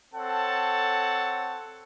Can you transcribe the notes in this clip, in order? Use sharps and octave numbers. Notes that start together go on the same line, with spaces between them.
C4 A4 C#5 F#5 A5